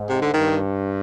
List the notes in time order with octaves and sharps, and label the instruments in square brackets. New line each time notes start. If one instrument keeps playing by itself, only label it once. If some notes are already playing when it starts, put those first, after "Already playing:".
Already playing: [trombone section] G#2
[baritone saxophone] C3
D3
[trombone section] G2 [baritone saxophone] D#3